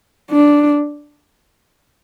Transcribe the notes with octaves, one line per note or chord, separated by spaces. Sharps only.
D4